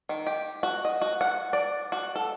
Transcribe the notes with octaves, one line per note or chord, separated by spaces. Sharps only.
D#3
G4
F#4
D#5
F#4
F#5
D5
F#4
A4